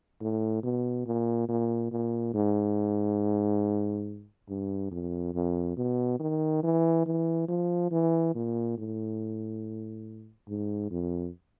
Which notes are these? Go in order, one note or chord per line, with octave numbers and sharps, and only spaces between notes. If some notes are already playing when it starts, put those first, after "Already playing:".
A2
B2
A#2
A#2
A#2
G#2
G2
F2
F2
B2
D#3
E3
E3
F3
E3
A#2
A2
G#2
F2